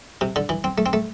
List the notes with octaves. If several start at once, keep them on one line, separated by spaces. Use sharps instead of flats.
C3
D3
E3
C4
A3
C4
A3